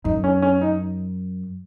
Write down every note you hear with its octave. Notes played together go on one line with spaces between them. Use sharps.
F#2 D#4
C#4
C#4
D#4